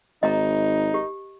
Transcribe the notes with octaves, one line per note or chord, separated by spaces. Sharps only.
G#1 D#4 D#5 A#5
G4